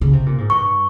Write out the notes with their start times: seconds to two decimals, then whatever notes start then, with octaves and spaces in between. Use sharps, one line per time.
0.01 C#3
0.13 C3
0.26 A#2
0.38 G#2
0.50 G2 C#6